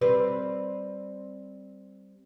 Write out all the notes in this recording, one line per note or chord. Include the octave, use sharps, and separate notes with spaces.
G3 C4 B4